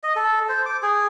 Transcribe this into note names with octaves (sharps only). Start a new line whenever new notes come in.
D#5
A4
C5
D6
G#4